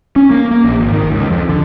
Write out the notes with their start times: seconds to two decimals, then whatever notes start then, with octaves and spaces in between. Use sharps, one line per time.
0.16 C#4
0.31 A#3
0.51 A#3
0.64 A#1
0.78 G#1
0.93 D#3
1.11 C#2
1.30 F2
1.49 D3